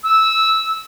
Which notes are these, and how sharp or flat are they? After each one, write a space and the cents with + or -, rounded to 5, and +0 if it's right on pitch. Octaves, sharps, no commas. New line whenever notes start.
E6 -15